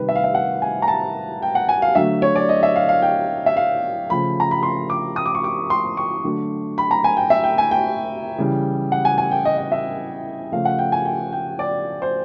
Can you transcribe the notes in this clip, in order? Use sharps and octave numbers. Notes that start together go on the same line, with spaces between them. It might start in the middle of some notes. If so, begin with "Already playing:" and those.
Already playing: C3 D#3 G3 B4
E5
F5
E5
F#5
G#5
A#5
A5
G5
F#5
G#5
F5
D3 F#3 A3 E5
C#5
D5
D#5
E5
F5
F5
G5
E5
F5
C#3 F3 A3 B5
A#5
B5
C6
D6
D#6
D6
C#6
D6
C6
C#6
D3 F#3 A3
B5
A#5
G#5
G5
E5
G5
G#5
G5
C#3 E3 G3
F#5
G#5
G#5
G5
D#5
D#5
E5
C#3 F3 A3 F5
F#5
G5
G#5
G5
G5
D5
C5